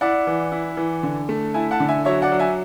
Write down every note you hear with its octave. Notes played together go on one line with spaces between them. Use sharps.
E4 D5 F#5
E3
E4
E3
D3
A3
E4 E5 G#5
F#5 A5
D3
E5 G#5
F#3 C#5 E5
D5 F#5
F#3
E5 G#5